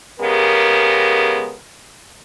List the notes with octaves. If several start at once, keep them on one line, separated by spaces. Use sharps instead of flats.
C#3 G#3 B3 G4 A#4